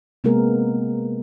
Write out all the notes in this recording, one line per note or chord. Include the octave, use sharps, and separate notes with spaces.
C3 G#3 A#3 B3 G#4 A#4